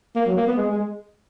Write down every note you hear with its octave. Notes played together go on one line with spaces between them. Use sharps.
A#3
F#3
A#3
B3
G#3
G#3